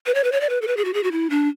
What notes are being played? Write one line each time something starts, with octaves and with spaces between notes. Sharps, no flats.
B4
C#5
B4
C#5
D5
B4
A4
B4
G#4
F#4
G#4
F#4
E4
D4